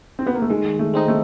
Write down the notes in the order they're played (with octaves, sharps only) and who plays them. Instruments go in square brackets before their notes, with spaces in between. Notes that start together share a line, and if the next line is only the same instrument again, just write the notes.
[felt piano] C4
B3
A#3
A3
[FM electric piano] D#3 [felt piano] G#3
[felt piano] A3
[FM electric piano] G#3 C4 D#4
[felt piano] A3